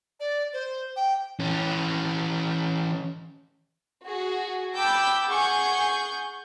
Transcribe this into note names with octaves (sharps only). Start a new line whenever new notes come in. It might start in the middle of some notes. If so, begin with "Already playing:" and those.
D5
C5
G5
E3 C#4
F#4 G#4
G5 A5 B5 D6 E6 G6
G#4 F#5 G#5 C#6 G6